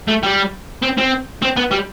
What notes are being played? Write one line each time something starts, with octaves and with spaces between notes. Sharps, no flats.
A3
G3
C4
C4
C4
B3
G3